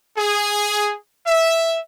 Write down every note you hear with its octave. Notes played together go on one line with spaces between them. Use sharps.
G#4
E5